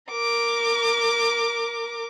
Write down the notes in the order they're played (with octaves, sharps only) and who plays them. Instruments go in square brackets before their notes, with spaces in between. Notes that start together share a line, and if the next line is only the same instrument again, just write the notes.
[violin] A#4 D6